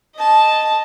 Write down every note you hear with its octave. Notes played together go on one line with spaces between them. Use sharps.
D#5 A5